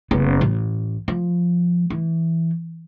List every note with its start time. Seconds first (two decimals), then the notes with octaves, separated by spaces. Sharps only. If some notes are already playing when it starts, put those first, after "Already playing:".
0.11 F#1 B3
0.41 A1
1.08 F3
1.90 E3